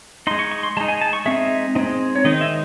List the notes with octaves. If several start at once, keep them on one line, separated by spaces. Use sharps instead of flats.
G#3 D#4 C6
C#6
C#6
C6
G#3 D#4 A5
G#5
A5
C#6
G#3 C4 D#4 E5
G#3 C4 D#4
C#5
D#3 G#3 C4 D#4 D#5
E5